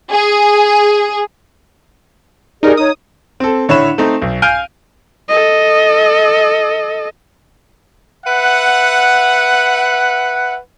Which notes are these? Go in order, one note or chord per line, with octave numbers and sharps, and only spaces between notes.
G#4
D#4 G4 G#4 A#4 D5
D#4 C#5 D#6
C4 A4
A2 D3 C#5 E5 B5 E7
A3 C4 D#4
B1
F5 G#5 F6 G6 D7 D#7
A4 D#5
B4 E5 F#5